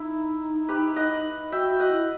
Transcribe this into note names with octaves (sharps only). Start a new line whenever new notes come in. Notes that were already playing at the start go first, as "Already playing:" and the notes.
Already playing: D#4 E4
G4 B4
D#5 F#5
F#4 E5 G5
F#4
D#5 F#5
E4